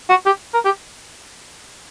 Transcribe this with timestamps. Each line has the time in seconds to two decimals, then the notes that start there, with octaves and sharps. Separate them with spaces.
0.10 F#4
0.26 G4
0.54 A#4
0.65 G4